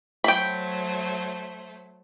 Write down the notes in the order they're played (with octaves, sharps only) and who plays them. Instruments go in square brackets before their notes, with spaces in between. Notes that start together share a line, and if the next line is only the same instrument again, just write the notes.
[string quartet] F#3 A3 C5 [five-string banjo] G5 B5